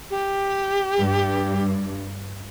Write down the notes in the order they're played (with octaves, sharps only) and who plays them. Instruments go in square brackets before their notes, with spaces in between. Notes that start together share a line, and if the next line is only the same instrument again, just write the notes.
[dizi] G4
[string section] G2